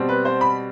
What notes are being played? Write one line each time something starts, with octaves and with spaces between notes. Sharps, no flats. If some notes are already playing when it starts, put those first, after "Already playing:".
Already playing: B2 G3 C4
B4
C5
B5